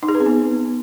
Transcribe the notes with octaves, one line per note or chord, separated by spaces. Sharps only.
D#4
G#4
B4
C4
B3